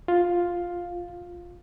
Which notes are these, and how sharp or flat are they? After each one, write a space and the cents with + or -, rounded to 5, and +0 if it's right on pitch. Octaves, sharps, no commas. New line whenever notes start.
F4 +5